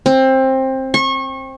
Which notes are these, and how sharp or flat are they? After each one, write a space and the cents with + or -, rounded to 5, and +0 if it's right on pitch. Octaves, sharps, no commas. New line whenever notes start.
C4 +20
C#6 -30